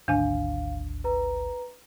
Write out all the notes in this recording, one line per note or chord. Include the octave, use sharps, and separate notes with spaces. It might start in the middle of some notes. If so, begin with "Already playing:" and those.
G#1 D2 D4 F5 G#5
B4 A#5